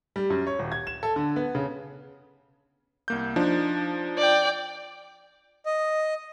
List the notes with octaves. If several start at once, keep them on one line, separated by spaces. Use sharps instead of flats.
G3
F#2
C#5
D#1
G#6
E7
A4
D3
B3
C#3
C2 A#3 G6
F3 D4 D#4
D5 G5
D#5